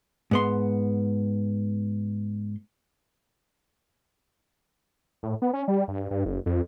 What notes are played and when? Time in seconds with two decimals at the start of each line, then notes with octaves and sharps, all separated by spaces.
0.31 G#2 B3 C6
5.23 A2
5.42 B3
5.53 C#4
5.68 G3
5.88 G2
6.11 G2
6.25 F#1
6.46 F2